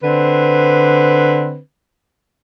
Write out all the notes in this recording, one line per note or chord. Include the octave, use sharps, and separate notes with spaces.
D3 C4 B4